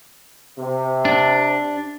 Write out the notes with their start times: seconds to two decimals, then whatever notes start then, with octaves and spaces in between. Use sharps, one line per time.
0.58 C3
1.05 D4